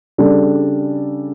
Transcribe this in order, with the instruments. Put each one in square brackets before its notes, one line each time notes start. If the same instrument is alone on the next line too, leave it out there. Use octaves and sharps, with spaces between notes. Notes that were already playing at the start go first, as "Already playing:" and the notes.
[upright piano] C#3 G3 D4 A4 D5